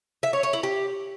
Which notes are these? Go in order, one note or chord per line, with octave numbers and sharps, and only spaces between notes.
E5
C#5
C#5
E4
G4